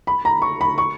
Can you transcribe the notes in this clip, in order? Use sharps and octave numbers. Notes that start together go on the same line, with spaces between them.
B5
A#5
C#6
B5
C#6